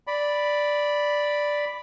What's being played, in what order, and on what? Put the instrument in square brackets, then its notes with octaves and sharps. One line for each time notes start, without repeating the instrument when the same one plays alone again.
[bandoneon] D5 B5